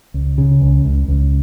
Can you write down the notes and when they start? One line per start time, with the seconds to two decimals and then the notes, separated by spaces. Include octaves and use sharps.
0.14 C#2
0.38 C#3
0.61 C#2
0.85 C#2
1.08 C#2